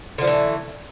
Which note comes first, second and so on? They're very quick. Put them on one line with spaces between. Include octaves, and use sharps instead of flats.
D3 F3 A3 E3